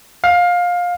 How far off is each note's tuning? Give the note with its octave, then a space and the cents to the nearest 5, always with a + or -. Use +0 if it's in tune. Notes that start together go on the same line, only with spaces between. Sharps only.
F5 +20